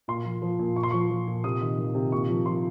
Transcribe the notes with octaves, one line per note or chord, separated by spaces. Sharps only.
A#2 C6
F3
F3
A#2
A#2 C#6
C6
F3 C#6
F3
A#2
C3 D#6
D#3
D#3
C3
A#2 C#6
F3
F3 C6